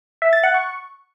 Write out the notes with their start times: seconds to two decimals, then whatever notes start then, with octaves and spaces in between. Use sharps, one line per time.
0.22 E5
0.33 A6
0.43 F#5
0.54 C#6